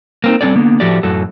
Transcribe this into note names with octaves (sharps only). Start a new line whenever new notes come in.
A#3 C4 D#4
G3 C4 C#4 A4 D5
D3 A#3 B3
A2 F3 A3 F#4 G4 D5
F#2 A2 F#4 A4